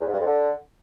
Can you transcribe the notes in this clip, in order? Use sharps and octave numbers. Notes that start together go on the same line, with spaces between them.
E2
G#2
G2
F2
D3